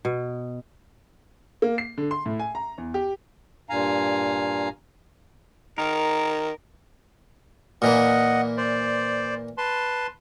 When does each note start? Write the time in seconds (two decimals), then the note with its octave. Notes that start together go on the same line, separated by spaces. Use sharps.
0.05 B2
1.62 A#3
1.78 C7
1.98 D3
2.11 C6
2.26 A2
2.39 G#5
2.55 A#5
2.78 E2
2.94 G4
3.70 G2 A#2 F5 G#5 A#5
5.78 D#3 A#4 A#5
7.82 A#2 E3 A#3 D#5 F#5
8.57 C5 D5
9.58 B4 A5 C6